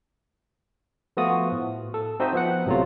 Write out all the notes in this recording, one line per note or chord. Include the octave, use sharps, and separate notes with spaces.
F3 A3 B3 F4 F#4 D#6
A2
A4
C4 D#4 F#4 C5 D#5 E5
F3 B3 F#5
A1 C3 F#3 A3 F4